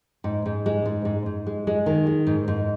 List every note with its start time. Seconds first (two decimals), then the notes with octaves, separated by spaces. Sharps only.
0.24 G#2
0.46 G#2
0.66 G#3
0.86 G#2
1.05 G#2
1.26 G#2
1.47 G#3
1.67 G#3
1.86 D#3
2.07 G#3
2.27 G#2
2.48 G#2